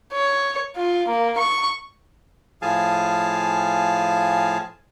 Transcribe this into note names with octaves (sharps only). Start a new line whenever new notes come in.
C#5
F4
A#3
C#6
A2 F3 G#4 F5 G#5 A5